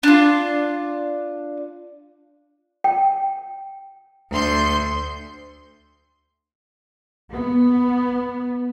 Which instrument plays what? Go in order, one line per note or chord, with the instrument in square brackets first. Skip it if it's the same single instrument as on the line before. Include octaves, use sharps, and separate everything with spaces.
[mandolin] D4 F4
[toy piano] G5
[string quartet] D2 C6 G6
[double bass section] B3